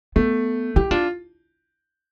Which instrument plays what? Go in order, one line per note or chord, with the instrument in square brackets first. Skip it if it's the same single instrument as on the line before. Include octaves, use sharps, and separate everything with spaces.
[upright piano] A3 [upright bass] B3
[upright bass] E4 [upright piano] G4
[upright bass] D4 [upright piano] F4